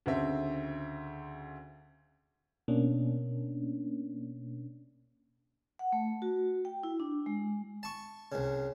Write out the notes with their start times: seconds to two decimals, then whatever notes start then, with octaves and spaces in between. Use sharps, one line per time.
0.06 D2 C#3 C4 E5
2.68 B2 A#3 C#4 D4
5.79 F#5
5.92 A3
6.22 F#4
6.65 G5
6.83 E4
7.00 D4
7.26 G#3
7.83 A5 C#6
8.32 C2 C#3